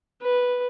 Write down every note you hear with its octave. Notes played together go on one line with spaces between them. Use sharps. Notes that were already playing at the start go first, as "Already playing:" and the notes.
B4